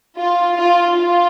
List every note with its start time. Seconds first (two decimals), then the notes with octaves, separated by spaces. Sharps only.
0.17 F4
0.57 F4
0.97 F4